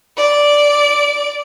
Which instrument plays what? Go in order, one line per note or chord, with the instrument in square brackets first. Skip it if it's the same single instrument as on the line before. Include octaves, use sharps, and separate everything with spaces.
[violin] D5 D7